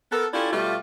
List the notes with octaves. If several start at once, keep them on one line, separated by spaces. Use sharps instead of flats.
B3 A4 A#4
C#4 E4 F4 G4 A4 D5
B2 G3 A3 F4